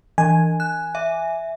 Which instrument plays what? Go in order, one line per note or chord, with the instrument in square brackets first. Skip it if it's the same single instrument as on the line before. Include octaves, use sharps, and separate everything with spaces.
[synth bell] E3 [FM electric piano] G#5
[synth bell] F#6
E5